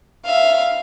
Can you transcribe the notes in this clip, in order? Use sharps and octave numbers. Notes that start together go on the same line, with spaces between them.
E5 F5